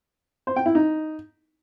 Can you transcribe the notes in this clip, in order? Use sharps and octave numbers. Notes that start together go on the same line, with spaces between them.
C5
G5
E4
D#4